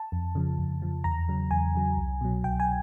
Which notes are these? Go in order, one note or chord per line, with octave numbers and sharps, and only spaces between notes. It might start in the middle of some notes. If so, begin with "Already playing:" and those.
Already playing: A5
F2
C#3 F3
F2
C#3 F3
E2 A#5
C#3 F#3
E2 G#5
C#3 F#3
C2
B2 F#3
C2 G5
G#5